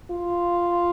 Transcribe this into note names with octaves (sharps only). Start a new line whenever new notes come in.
F4